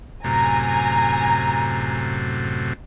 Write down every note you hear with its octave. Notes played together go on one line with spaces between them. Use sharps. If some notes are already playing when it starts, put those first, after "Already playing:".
F#2 A2 C3 G#5 A#5